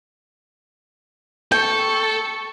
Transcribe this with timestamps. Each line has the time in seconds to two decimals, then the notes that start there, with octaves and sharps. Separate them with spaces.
1.52 A4 G5 C#6